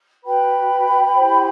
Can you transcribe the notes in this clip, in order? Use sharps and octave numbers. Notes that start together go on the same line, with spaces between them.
F#4 B4 G5 B5
E4 G4 C5